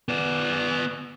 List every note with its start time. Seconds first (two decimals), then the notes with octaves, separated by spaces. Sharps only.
0.09 B3 D5